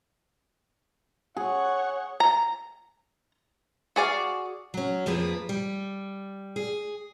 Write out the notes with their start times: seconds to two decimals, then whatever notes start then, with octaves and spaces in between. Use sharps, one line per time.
1.37 G#4 C#5 F#5
2.20 A#5
3.96 F#4 G#4 D5 F5
4.74 F#3 C#4
5.06 F2 F3 A#3 G#4 B4
5.49 G3
6.56 G#4